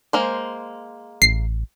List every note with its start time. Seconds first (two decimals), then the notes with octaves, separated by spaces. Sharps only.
0.13 G#3 A#3 C5
1.22 A1 C7